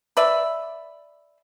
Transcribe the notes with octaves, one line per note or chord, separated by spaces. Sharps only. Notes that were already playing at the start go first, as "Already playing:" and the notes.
B4 D5 E5